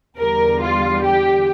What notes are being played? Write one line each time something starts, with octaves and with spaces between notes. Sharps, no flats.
E2 D3 G3 A#4
F4
G4